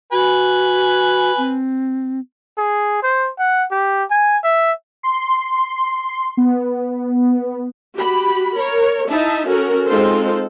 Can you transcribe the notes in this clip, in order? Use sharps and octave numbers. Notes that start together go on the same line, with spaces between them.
F#4 B4 G#5
C4
G#4
C5
F#5
G4
G#5
E5
C6
B3
F#4 G4 B5
A#4 C#5
D#4 E4 E5 A5
C#4 F#4 A4 A#4
G#3 C4 D#4 F4 A4 C5